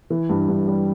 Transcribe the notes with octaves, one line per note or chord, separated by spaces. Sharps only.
E3
G2
G2
G3